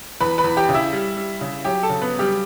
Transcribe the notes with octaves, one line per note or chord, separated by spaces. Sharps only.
E2 B4 B5
B4 B5
E2
G4 G5
C#3
E4 E5
G3
G3
C#3
F#3 G4 G5
A4 A5
C#3
B3 B4
F#3
G3 G4